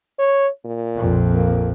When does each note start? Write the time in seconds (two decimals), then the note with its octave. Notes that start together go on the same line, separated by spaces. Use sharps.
0.19 C#5
0.65 A#2
0.96 A#1 F2
1.34 A#3